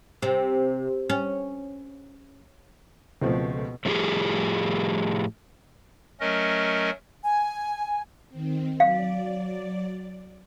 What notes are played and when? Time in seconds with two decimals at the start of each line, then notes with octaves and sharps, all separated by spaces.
0.22 C3
1.10 C#4
3.22 C#2 B2 F3 A3 C4
3.85 A2 F3 G#3 A3 G4 G#4
6.20 F#3 A3 C#4 A#4 D#5
7.23 G#5
8.29 D#3 C4
8.80 F#3 D5 F5